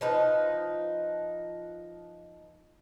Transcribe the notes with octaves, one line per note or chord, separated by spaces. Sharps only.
F3 D#4 B4